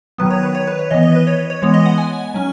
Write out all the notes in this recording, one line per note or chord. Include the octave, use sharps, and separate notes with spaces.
D#3 F#3 B3 B4
C#5
B4
C#5
B4
C#5
E3 B3 D#5
D#5
B4
C#5
C#5
C#5
E3 G#3 B3 C#5
D#5
F#5
G#5
F#3 C#4